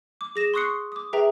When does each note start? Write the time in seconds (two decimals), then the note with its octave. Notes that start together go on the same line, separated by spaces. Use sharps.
0.21 D6
0.36 G#4 A#6 E7
0.54 C6 C#6 D#6 F#6 C7 C#7
0.92 D6 D#6
1.13 G#4 B4 E5 G5 A#5